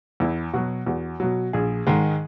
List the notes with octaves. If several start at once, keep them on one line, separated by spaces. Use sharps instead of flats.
E2 E4
B2 F#3 F#4
E2 F#4
B2 F#3
A#1 G#4
G#2 D#3 G#3